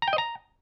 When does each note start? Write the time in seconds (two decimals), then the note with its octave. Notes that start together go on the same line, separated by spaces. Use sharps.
0.02 A#5
0.08 G5
0.13 D#5
0.18 A#5